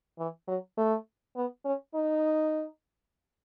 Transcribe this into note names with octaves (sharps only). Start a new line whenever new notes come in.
E3
F#3
A3
B3
C#4
D#4